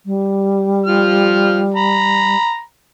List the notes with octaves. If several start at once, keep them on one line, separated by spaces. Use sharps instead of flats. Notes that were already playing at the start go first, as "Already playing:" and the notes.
G3
F3 F6
A#5 B5